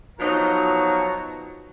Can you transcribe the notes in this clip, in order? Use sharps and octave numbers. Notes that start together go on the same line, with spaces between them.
B2 F3 F#3 D#4 A#4